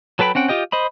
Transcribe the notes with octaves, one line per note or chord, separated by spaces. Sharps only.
F#3 A4 B4 G5 B5
C4 C#4 F#5 G5
F4 G4 D#5 G5
C5 D#5 B5